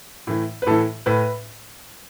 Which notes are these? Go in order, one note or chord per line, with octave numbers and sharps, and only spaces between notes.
A2 E3
B4
A2 E3 A4
A2 B4